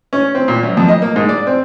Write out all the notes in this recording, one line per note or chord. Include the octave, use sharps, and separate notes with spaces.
C#4
C4
A#2
F#2
F2
D#5
A#3
G#2
D5
C4